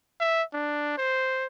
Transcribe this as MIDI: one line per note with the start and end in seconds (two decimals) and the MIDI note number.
0.20 0.43 76
0.53 0.94 62
0.98 1.46 72